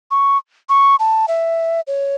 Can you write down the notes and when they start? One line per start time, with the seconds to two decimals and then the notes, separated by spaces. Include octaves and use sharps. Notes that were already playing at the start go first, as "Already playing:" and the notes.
0.11 C#6
0.69 C#6
0.99 A5
1.28 E5
1.87 C#5